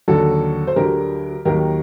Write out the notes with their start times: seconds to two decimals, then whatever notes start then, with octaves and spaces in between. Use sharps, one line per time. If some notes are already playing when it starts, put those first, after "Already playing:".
0.08 D#2 D3 F#3 F#4 A4
0.67 C5
0.76 D2 D3 F#3 G4 A#4
1.45 D#2 D#3 F#3 G4 A#4